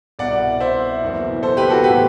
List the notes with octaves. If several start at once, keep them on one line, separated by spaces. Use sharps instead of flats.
C2 B2 D5 F#5
C5 E5
F#1 E2 B2
A4 C5
G4 B4
F#4 A4
A2 E3 G4 B4